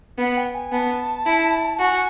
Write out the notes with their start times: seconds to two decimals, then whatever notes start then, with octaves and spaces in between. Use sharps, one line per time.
0.18 B3 F#5
0.37 G5
0.54 G#5
0.72 B3 A5
1.26 E4
1.79 F#4 G#5